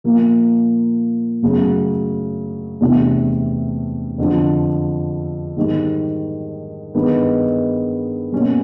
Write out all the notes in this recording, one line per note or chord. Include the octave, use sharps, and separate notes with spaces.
A#2 F3 A#3
F#2 C#3 F#3 A3
E2 C3 E3 A3 D4
F2 D3 F3 G#3
G#2 D#3 G3
G2 D#3 G#3 B3 D#4
B2 G3 A#3 C#4